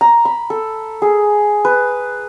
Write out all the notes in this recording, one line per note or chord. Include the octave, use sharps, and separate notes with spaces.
A#5
B5
A4
G#4
B4